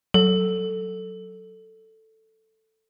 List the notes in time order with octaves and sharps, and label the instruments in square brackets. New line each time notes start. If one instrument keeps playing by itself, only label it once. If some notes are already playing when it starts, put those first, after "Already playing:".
[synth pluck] F#3 [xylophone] A4